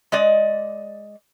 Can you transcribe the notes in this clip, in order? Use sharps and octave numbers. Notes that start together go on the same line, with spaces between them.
G#3 D5 D#5